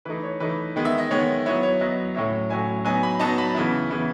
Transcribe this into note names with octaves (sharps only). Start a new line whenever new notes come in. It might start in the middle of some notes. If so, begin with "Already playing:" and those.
E3 A3 D#4 B4
C#5
E3 A3 D#4 B4
D#3 G#3 B3
E5
D#5
D#3 G#3 B3 C#5
F#3 B3 E4 C#5
C#5
F#3 B3 E4 D#5
A2 F#3 C#4 E4 E5
A2 F#3 C#4 E4 G#5
F#3 B3 D#4 G#5
B5
F#3 B3 D#4 A5
B5
C#3 E3 B3 E4
C#3 E3 B3 E4